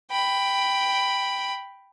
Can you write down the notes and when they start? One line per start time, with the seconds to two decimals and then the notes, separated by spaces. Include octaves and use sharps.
0.11 G5 B5